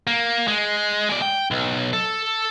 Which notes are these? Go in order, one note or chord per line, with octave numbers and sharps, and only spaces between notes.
A#3
G#3
G#3 D5
G5
B1
A4